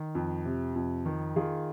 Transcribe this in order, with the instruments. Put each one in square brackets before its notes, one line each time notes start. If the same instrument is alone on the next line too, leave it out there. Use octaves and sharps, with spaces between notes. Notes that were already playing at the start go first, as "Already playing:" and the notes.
Already playing: [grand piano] D#3
F2
C3
F2
D#3
D#3 F4 G#4